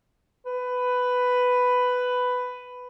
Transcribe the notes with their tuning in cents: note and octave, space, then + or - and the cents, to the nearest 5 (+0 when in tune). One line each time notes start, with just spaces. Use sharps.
B4 +10